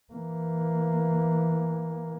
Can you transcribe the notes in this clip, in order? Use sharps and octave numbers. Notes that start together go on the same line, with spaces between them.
E3 A#3